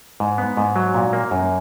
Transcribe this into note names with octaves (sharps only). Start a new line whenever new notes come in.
G#2
B3
G#2
F#3
A#2
A#3
F#2